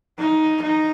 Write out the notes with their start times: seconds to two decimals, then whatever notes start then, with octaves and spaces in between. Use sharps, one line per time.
0.19 D#4
0.62 D#4